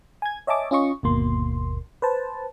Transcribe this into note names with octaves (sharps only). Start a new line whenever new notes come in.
G#5 G#6
C#5 D#5 E5 G#5 A5 D6
C#4 F4 D#5 C#6
G1 D#2 B2 A#3 C6
B4 C5 A5